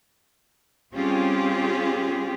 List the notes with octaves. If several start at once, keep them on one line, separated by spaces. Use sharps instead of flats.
G3 C4 C#4 F4 G4 G#4